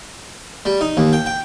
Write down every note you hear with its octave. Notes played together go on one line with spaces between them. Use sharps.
G3
D#4
D#2
G5
G5